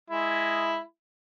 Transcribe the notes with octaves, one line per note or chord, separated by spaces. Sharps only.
G#3 E4